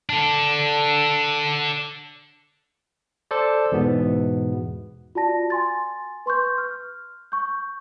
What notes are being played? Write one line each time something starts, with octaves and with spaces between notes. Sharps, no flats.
D4 A4
A4 C5 D5
E2 G#2 B2 B3
F4 F#4 D5 A5 A#6
G#5 C6 A6
B4 C6 C#6 G6
F6
C#6 G6